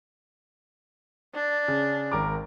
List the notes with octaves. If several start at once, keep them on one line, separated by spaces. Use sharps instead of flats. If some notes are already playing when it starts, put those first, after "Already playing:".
D4
C#3
G#1 A#4 D6